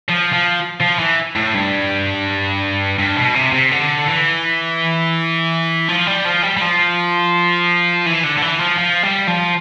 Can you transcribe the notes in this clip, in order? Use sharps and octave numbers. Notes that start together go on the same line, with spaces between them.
F3
F3
F3
E3
A2
G2
G2
B2
C3
C3
D3
E3
F3
G3
F3
G3
G3
F3
E3
D3
D3
E3
F3
F3
G3
F3